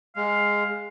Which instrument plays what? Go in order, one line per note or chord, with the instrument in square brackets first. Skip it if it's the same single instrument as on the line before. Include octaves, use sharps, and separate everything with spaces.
[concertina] G#3 [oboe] F5